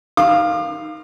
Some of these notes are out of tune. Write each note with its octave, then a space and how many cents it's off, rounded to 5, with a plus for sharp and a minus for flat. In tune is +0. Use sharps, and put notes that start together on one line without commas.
D#3 +0 F5 +0 D6 +45